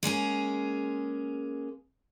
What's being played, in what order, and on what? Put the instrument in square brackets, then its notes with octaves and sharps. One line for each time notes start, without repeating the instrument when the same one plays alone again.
[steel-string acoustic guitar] G#3 A#3 C#4 G#4